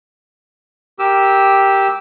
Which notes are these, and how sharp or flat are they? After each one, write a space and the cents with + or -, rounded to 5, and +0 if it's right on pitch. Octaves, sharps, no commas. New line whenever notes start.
G4 +0 A#4 +0 E6 -15